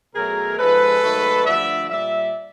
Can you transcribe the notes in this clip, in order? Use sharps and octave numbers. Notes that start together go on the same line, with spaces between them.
B2 F#3 A3 G#4 A#4
G#2 F3 G#3 A4 B4
G#2 D#3 F#3 A3
G2 D3 F3 A3 D5 E5
A#2 G3 D5 E5